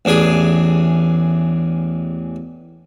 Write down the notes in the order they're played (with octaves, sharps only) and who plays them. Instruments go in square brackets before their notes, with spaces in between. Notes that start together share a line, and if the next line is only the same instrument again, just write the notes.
[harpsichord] A1 E2 D4 G#4